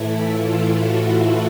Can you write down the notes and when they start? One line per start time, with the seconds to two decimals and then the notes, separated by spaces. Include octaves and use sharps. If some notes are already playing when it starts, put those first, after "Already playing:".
Already playing: A2 E3 A3 E4
0.26 F4
0.76 F#4